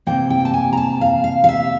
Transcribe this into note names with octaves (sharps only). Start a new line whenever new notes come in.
C3 F3 A#3 G5
G5
A5
G#5
A#5
A5
F5
F5
F5
E5